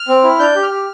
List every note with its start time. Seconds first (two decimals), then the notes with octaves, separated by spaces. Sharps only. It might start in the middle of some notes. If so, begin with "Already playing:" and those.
Already playing: F6
0.08 C4
0.24 E4
0.39 D4 G6
0.55 G4
0.63 F6
0.71 G4